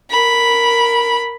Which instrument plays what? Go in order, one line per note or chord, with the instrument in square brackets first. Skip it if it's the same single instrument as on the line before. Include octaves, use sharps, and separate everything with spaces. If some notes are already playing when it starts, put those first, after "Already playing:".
[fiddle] A#4 B5